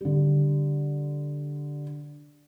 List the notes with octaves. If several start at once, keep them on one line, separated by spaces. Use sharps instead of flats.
D3 G3